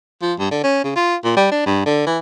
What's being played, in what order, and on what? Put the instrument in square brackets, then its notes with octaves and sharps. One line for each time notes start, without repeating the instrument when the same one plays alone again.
[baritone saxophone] F3
G2
D3
C#4
C#3
F4
A#2
G3
D4
G2
D3
E3